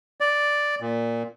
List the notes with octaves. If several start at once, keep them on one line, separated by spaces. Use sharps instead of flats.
D5
A#2